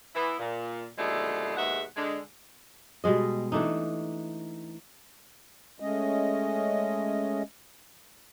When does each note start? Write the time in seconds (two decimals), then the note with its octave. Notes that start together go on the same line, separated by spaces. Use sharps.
0.14 E3 B3 E4
0.38 A#2
0.97 D#2 B2 D3 F3 G#3 A3
1.57 D#2 G#2 B2 G#3 E5 F#5
1.95 D3 G#3
3.04 B2 G3 G#3 D#5
3.52 E3 A3 D4 D#4
5.80 G#3 A3 C#4 D#5